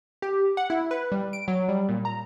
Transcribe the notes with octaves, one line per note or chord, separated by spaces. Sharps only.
G4
F#5
E4
B4
G3
D7
F#3
G3
A#2
A#5